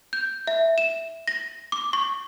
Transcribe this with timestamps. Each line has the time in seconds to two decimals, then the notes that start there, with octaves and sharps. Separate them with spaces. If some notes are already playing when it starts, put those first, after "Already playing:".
0.13 G6
0.47 E5
0.78 E7
1.28 A#6
1.72 D6
1.93 C#6